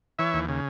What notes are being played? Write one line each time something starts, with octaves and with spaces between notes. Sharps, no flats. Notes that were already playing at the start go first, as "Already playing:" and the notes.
E3 C#5 E5
D#2
C#3